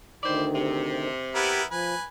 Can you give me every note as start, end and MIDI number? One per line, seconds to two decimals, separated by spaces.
0.23 1.08 38
0.23 1.08 51
0.23 0.46 64
0.23 0.46 72
0.23 0.46 74
0.55 1.50 48
1.35 1.64 59
1.35 1.64 64
1.35 1.61 67
1.35 1.64 70
1.71 1.94 53
1.71 2.05 71
1.71 2.05 80